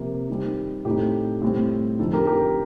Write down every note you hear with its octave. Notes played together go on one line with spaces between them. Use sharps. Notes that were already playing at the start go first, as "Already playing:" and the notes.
Already playing: C3 F3 A#3
D#3 G3 C4
A2 A3 C4 D#4 G4
A2 G3 C4
D3 F3 C4 D#4 A4
G4 A#4
G4 A#4